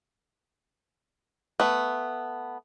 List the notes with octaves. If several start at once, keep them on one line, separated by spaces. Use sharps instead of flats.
A3 B3